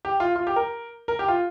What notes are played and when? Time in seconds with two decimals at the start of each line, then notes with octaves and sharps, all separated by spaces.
0.05 G4
0.20 F4
0.36 F4
0.47 G4
0.56 A#4
1.08 A#4
1.19 G4
1.28 F4